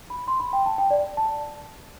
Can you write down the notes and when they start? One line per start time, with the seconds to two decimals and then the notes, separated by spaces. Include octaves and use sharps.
0.10 B5
0.28 C6
0.40 B5
0.53 G5
0.66 A5
0.78 G5
0.91 D5
1.17 A5